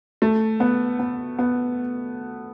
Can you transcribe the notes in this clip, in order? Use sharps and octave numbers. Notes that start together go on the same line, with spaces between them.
A3
B3
B3
B3